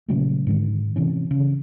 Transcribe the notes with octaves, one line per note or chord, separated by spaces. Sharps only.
A#2 C#3 F#3 A3
G#2 D3 D#3
C3 E3 C#4
C#3